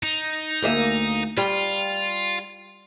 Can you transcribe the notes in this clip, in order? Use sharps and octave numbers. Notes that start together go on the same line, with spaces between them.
D#4
D2 A#3 E5
G3 F4